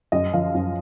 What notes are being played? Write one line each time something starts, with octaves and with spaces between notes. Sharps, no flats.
F#2 D#5
F3 F5
F#2